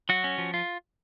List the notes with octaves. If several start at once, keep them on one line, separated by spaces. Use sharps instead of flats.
F#3 F#4
C#4
F3
F4